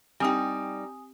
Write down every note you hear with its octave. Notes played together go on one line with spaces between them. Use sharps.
G3 C4 D#4 G4 G5 G#5 D#6